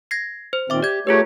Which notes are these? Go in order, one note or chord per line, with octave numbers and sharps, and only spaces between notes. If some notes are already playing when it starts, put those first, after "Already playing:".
G#6 A#6 C7
C5
A#2 D#3 C4 E5 D6
G4 D5 G#6
A3 F4 G4 G#4 B4 C#5